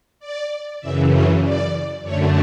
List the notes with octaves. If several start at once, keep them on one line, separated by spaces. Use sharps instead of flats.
D5
F#2 C#3 E3 E5
C#5
D5
F#2 D3 A3 C#5